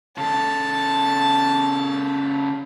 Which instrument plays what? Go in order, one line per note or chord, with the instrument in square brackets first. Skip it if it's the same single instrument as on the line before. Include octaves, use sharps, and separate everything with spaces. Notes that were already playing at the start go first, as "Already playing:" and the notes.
[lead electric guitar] C#3 A4 [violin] A5